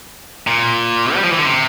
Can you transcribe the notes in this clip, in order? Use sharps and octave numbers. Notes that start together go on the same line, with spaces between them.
A#2
G3
F3
E3
D3
C3